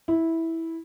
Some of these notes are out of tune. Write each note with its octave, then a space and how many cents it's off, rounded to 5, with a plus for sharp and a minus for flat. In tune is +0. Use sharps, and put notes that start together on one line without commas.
E4 -10